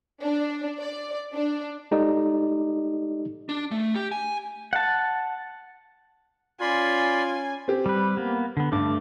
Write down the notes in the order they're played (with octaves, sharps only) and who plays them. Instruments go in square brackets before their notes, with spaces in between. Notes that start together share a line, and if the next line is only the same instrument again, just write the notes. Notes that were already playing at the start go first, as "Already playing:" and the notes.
[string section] D4
D5
D4
[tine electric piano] G#3 D#4 G4 A4 D5 D#5
[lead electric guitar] D4
A3
G4
G#5
[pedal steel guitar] F#5 A5
[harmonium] C#4 [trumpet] F4 [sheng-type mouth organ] D5 B5 C6 [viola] G#5
[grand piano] C4 G4
[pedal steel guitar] G3 B4
A#3 B3
D3 B3
[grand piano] G2 [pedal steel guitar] A3 D6